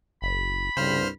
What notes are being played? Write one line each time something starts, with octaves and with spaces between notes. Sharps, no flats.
F#1 B5
C2 G2 C#3 C5 F6